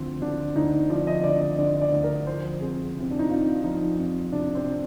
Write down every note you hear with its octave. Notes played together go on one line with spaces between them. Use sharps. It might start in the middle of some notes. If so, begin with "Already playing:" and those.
Already playing: D2 F3 C4
D3 D4
D2 D#4
F3 D5
D#5
D2 D5
D#5
D3 D5
D5
D2
A#4
F3 C5
F2 G#4
C3 C4
D4
D#4
F2 F4
F3 D#4
F2
C3 D4
C4